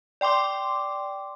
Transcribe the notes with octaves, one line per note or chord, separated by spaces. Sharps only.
D5 G5 C6 D6